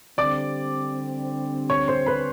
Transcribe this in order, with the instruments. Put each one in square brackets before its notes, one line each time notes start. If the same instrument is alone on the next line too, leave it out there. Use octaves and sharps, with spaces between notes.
[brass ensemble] D3 G3 C4 [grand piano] D5 D6
[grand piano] C#5 C#6
C5 C6
B4 B5